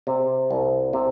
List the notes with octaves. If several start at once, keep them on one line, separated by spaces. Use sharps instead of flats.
C3
C2
C3